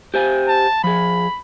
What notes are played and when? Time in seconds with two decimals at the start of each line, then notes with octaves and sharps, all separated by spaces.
0.14 G4 C5 G#5
0.48 A5
0.84 F3 G#4 B5